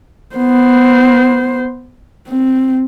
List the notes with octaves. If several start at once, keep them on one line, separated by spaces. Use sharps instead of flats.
B3 C5
C4